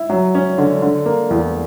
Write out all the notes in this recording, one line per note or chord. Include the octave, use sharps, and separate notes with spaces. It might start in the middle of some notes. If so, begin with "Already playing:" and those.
Already playing: E4
F#3
C#4
D3
D3
A#3
E2